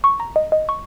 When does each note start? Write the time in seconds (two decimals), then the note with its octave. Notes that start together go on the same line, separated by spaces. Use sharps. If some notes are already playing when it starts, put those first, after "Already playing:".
0.04 C#6
0.20 A#5
0.36 D#5
0.52 D#5
0.69 C#6